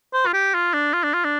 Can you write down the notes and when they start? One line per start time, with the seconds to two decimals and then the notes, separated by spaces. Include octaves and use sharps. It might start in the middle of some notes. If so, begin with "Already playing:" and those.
0.13 C5
0.26 F4
0.34 G4
0.54 F4
0.73 D4
0.93 F4
1.03 D4
1.14 F4
1.24 D4